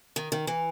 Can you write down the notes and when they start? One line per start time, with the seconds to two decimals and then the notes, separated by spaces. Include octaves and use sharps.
0.16 D#3
0.32 D#3
0.47 E3